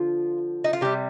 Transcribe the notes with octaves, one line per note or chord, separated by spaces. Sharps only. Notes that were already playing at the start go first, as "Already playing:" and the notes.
Already playing: D3 F3 F4
D#4
F4
C3 G3 G4